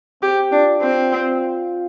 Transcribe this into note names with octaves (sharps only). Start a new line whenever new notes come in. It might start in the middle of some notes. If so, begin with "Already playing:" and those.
C4 G4
D4 F4
C4 F4